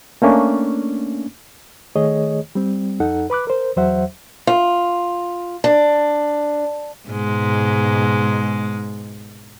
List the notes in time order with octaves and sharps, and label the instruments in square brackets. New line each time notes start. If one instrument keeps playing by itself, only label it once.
[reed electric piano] A3 A#3 C#4 D4
D#3 A3 G#4 C#5 D#5
G3 C4
F2 D#4 A4 F#5
B4 B5 D6 F#6
A#4 C5
E2 F#3 C5 E5 F#5
[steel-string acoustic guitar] F4
D4
[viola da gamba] G#2 B2 G#3